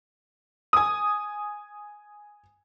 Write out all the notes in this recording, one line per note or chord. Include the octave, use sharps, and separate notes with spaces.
G#5 D#6